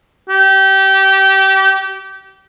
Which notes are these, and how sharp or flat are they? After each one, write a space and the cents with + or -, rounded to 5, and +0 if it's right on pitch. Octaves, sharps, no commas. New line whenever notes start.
G4 -25